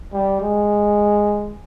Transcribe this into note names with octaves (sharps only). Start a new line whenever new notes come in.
G3
G#3